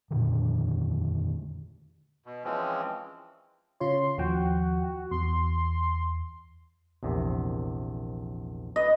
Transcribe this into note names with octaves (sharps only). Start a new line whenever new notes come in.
F2 A#2 D3 D#3
B2
E3 F3 G#3 C4 C#4
C#3 F4 C#5 C6
D#2 F3 F#4 G5
E2 C6
A#1 E2 C3
B4 D#5